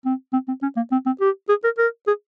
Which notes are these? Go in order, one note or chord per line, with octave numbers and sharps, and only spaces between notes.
C4
C4
C4
C#4
A#3
C4
C4
G4
G#4
A#4
A#4
G#4